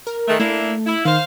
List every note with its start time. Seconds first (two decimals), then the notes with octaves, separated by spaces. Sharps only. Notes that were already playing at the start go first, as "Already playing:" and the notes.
0.07 A#4
0.28 D#3 G#3 A3
0.40 A3 A#3 D4 E4
0.86 E4
1.05 D#3 C5 F5